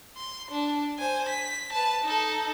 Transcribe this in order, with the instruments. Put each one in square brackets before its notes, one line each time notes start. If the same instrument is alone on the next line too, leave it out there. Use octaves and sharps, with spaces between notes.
[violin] C6
D4
C5 G#5
B6
B4 A5
D#4 A4